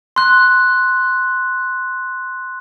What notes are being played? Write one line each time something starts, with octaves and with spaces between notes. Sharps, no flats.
C6 F#6